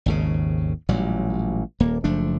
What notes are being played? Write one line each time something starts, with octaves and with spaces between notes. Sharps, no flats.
G#1 D#2 C#3
A1 A#2 F#3 G3
D#1 A#3
F#1 F3 A3 D4